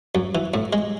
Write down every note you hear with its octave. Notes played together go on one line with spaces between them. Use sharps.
F#2
E3
A2
G#3